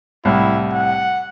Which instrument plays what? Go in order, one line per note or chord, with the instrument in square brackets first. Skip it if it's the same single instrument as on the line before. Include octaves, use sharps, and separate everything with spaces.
[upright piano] C2 A2 [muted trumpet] E4
[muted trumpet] F#5